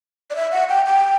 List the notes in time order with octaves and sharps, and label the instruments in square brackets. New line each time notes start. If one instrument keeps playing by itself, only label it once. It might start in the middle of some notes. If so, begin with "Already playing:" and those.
[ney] D5
E5
F#5
G5
G5